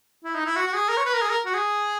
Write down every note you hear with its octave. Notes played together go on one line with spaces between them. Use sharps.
E4
D#4
E4
F#4
F#4
G#4
A#4
C#5
B4
A#4
G#4
A#4
F#4
G#4